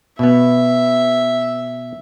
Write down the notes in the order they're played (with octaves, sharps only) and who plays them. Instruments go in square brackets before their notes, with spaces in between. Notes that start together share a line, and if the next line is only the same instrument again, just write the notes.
[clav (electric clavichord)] B2 B3 [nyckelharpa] E5